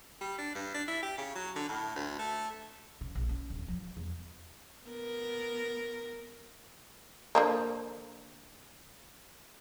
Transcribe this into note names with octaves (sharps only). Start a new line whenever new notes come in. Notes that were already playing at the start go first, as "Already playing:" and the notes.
G3
D4
G2
D4
E4
G4
C#3
F#3
D3
A2
D2
A3
C#3
A#1
C#4
D1
F3
E2
B3 A#4
D3 F3 A#3